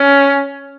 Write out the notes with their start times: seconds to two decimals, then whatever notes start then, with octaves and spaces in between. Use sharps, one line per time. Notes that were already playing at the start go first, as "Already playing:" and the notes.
Already playing: C#4